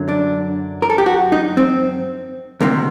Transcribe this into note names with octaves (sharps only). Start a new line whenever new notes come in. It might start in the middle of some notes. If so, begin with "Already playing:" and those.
Already playing: F#2 D3 F#3
D4
A#4
A4
G4
F#4
D#4
C4
D2 C3 D#3 A#3